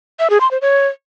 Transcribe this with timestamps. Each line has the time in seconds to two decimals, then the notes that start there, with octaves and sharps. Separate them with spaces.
0.19 E5
0.30 G#4
0.41 C6
0.51 C5
0.62 C#5